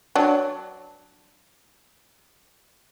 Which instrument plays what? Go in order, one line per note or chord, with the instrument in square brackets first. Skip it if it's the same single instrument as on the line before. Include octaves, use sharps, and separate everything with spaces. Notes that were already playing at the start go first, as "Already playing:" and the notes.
[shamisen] F#3 D4